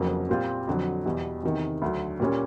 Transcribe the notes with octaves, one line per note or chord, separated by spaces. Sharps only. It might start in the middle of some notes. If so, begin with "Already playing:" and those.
Already playing: F1 F2 C#3 F#3 A#3
A#2 G3 C4 F4
F2 D3 F#3
E2 B2 G3
E2 C3 D#3
D2 D3 F#3
A#2 G3 A#3 C#4